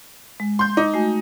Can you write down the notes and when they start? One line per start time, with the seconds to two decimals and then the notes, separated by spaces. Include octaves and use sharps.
0.40 G#3
0.59 C6 G6
0.77 D#4 D6
0.94 A3 F#4 G#5